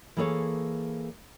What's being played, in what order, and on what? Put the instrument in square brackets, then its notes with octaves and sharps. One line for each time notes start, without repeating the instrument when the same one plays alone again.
[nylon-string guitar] E3 A#3 G#4 A4 C#5